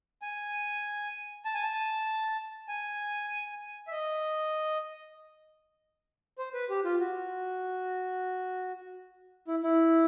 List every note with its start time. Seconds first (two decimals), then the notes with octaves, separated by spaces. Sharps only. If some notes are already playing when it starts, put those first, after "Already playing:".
0.22 G#5
1.45 A5
1.54 G#5
1.63 A5
2.68 G#5
3.88 E5
3.92 D#5
6.38 C5
6.54 B4
6.70 G4
6.85 F4
7.00 F#4
9.48 E4
9.63 E4